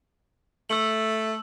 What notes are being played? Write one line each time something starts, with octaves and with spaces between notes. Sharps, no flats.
A3 E6 F#7